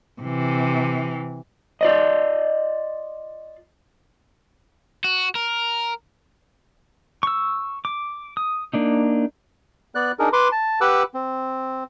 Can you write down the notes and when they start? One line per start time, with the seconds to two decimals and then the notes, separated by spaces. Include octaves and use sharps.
0.21 C3 E3
1.81 F4 D5 D#5
5.04 F#4
5.35 A#4
7.23 C#6 E6
7.85 D6
8.37 D#6
8.73 A#3 D4 D#4
9.95 B3 D5 F#6
10.19 D4 D#4 G#4 A#4
10.33 B4 C6 D6
10.52 A5
10.81 G4 B4 F#5 D6 E6 F#6
11.14 C4